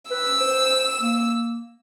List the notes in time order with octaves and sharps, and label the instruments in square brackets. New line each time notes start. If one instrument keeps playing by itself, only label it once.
[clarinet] B4 [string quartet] E6
[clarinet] C5
A#3